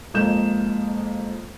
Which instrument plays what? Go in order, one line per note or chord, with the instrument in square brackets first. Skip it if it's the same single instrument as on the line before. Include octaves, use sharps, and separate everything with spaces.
[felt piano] F2 G#3 A#3 G6 E7